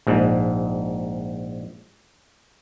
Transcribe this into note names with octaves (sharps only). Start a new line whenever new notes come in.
A#1 G#2